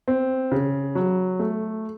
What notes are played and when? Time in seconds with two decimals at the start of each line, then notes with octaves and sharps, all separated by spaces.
0.08 C4
0.52 C#3
0.95 F#3
1.39 A3